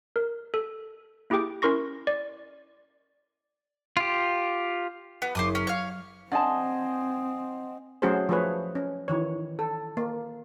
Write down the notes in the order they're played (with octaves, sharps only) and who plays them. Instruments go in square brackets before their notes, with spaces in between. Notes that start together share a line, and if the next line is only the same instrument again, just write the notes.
[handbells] A#4
A4
A#3 E4 G4 G#4 G5 D6
C#4 E4 A#4 C6 C#6 A#6
D5
[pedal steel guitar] F4 G4
[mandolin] B3 [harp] G4 F#5
[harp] F#1 F#2 [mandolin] C5 D6 D#6
[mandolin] C#4 [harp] F6
[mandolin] C#5 F5
[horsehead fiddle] C4 [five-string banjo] D4 A5 [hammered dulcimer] C5 D#5 G#5 [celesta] F#5
[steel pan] F#3 A3 C#4 F#4 G#4 C5
F3 A3 G#4 B4 C#5
C#4
D#3 E3 C#5
A4
A#3